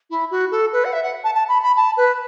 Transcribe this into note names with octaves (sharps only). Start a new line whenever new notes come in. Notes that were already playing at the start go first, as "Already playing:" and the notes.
E4
F#4
A4
B4
F#5
E5
F#5
A5
A5
B5
B5
A5
B4